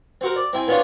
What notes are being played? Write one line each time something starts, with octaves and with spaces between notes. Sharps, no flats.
C4 F#4 A#4
D5
C4 E4 G5 G#5
A#3 B3 C#4 D4 F4 C#5